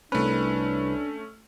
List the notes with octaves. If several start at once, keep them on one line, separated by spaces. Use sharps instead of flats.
C2 A3 C#4 D4 B4